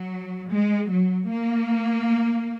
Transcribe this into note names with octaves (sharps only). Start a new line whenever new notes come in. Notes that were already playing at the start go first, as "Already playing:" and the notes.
Already playing: F#3
G#3
F#3
A#3